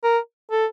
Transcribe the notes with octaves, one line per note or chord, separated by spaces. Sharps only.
A#4
A4